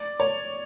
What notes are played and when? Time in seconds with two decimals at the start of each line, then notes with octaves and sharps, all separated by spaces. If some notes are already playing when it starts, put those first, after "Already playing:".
Already playing: D5
0.20 C#5